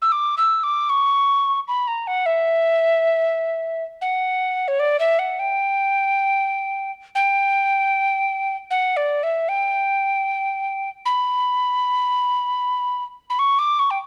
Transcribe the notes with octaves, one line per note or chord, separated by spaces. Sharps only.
E6
D6
E6
D6
C#6
B5
A#5
F#5
E5
F#5
C#5
D5
E5
F#5
G5
G5
F#5
D5
E5
G5
B5
B5
C#6
D6
C#6
G5